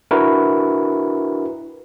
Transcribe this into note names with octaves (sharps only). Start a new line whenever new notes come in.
D4 E4 F#4 A#4 B4